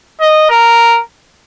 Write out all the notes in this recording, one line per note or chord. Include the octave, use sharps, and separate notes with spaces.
D#5
A#4